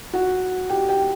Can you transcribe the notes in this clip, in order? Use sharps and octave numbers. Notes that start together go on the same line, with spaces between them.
F#4 F#5
G4 G5
G4 G5